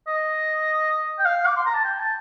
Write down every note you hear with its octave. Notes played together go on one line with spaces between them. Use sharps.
D#5
G5
F5
D6
C6
A#5
A5
G5
A5